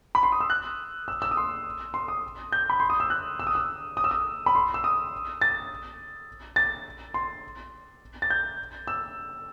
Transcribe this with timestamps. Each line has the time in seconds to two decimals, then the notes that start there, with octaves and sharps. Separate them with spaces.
0.15 B5
0.23 C6
0.32 D#6
0.41 E6
0.50 F#6
1.08 E6
1.22 E6
1.31 D#6
1.37 C6
1.94 C6
2.08 D#6
2.52 G6
2.70 B5
2.80 C6
2.90 D#6
3.00 E6
3.10 F#6
3.40 E6
3.47 D#6
3.55 E6
3.97 D#6
4.04 E6
4.11 D#6
4.46 B5
4.55 C6
4.74 E6
4.84 D#6
5.42 A6
6.56 A6
7.14 C6
8.22 A6
8.30 G6
8.88 E6